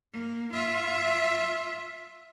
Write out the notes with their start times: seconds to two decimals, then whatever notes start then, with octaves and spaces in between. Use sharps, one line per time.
0.13 A#3
0.52 F4 E5